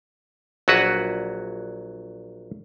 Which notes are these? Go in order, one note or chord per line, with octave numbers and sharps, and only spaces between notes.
A#1 F#3 F#4 B4 F#5